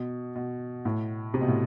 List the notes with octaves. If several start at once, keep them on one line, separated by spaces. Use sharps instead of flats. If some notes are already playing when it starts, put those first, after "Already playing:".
Already playing: B2
B2
A2
C3
B2
A2